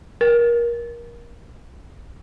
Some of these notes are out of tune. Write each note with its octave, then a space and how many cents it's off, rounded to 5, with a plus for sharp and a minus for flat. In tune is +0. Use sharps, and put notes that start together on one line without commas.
A#4 +25